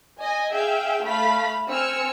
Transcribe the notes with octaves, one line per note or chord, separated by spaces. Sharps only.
D#5 G#5
G#4 E5 F5 G5
A3 F5 B5 B6
C4 G#5 E6 F6 C#7